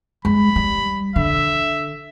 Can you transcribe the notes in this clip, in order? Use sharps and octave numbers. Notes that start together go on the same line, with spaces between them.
G#3 B5
G3
D3 E5